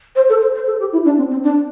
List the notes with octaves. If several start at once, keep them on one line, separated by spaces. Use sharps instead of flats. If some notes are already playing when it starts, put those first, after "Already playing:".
C5
A4
C5
C5
A4
G4
E4
D4
C4
C4
D4